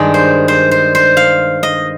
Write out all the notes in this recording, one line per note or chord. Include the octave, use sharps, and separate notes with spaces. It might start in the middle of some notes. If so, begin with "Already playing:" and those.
Already playing: G2 D#3 G#3 D5
C5
C5
C5
C5
F5
D#5